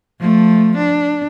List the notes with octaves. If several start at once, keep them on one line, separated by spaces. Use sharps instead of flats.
F3 A3
D4